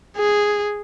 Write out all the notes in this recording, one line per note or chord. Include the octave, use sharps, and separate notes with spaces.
G#4